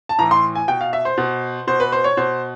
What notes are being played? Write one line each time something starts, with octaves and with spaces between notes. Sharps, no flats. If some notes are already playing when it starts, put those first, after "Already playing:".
A5
A2 E3 A#5
C6
G#5
B2 G5
F5
E5
C5
B2
B2 C5
B4
C5
C#5
B2 C5